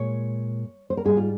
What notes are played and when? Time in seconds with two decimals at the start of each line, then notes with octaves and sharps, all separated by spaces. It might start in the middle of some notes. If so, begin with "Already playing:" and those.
Already playing: A#2 G#3 C#5
0.90 C5
0.97 A#4
1.05 G#2 G3 G#4
1.17 F4